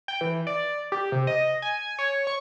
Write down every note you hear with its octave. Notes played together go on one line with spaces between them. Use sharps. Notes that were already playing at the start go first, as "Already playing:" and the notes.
G5
E3
D5
G4
C3
D#5
G#5
C#5
C#6